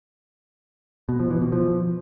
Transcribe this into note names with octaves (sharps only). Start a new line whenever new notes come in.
B2
F3
E3
B2
F3